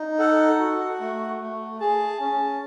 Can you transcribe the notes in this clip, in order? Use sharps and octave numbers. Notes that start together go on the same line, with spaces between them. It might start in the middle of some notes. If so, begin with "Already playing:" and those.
Already playing: D#4
A4 F#5
F#4
A3
A3
G#4 A5
C#4